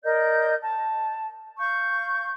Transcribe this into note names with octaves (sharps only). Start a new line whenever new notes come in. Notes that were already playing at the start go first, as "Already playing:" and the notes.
A#4 D5 D#5 G6
A5
F5 C#6 G6